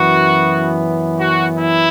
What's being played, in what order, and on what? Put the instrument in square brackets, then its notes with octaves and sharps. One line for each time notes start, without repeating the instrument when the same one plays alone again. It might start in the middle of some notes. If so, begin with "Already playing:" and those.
Already playing: [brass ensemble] F#2 E3 B3 F#4
F#4
E4